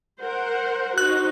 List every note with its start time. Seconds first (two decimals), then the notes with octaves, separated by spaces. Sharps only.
0.22 A#4 C5 F#5
0.98 D#4 F#4 C5 F#6